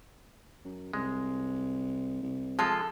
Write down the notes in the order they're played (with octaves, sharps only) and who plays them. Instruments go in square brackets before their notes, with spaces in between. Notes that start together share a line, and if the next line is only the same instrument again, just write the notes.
[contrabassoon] F#2
[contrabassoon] C2 [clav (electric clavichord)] G#3
[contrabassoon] C2
[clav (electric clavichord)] F3 G#3 F4 [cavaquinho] A4